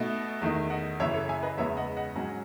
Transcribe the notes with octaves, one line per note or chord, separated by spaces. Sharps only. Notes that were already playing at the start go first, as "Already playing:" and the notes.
Already playing: B2 A3 D#4
E2 D#3 A3 D#4
D#5 F#5
F#2 C#3 E3 C#5 E5
A4 C#5
E5 G#5
B4 D#5
E2 C#3 G#3 B3 C#5 E5
D#5 F#5
D#5 F#5
G#2 F#3 C#4